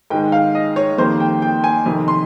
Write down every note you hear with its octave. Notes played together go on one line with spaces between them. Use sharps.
G#2 D#3 G#3 G5
F5
D#5
C#5
F2 D#3 G3 A#3 C5
G5
G5
G#5
F2 C3 D#3
C6